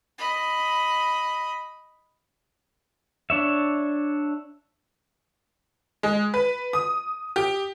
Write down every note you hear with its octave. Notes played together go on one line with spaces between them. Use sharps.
D#5 B5
D4 C#5 E5
G#3
B4
D#6
G4